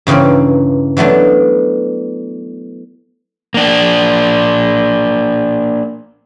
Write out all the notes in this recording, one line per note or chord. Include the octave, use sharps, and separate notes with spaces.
G2 C#3 E3 A#3 C4
E3 F#3 A3 B3 D4
A#3 D4